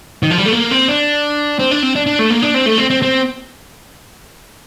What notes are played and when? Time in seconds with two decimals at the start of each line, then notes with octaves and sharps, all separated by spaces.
0.23 D#3
0.31 F3
0.38 G3
0.46 A3
0.53 A#3
0.71 C4
0.88 D4
1.59 C4
1.71 D4
1.83 C4
1.95 D4
2.06 D4
2.19 A3
2.30 A#3
2.42 D4
2.54 C4
2.66 A3
2.78 C4
2.90 C4
3.02 C4